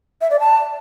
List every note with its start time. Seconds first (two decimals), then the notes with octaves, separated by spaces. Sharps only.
0.21 E5
0.31 D5
0.40 A5